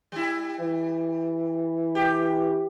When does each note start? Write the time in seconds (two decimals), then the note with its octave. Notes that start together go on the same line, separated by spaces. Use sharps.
0.12 G3 E4
0.60 E3
1.95 G4